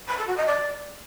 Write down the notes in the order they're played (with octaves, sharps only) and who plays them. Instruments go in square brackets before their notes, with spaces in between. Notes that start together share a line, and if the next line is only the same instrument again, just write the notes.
[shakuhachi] B5
A4
F#4
D#5
D5